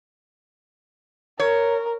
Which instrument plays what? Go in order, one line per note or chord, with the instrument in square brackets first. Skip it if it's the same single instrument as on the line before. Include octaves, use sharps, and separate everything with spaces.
[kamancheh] A#4 [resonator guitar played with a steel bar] C#5